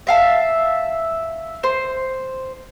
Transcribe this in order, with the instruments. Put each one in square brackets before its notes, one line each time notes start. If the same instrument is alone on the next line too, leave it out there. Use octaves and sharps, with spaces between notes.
[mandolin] E5 F5 A5
C5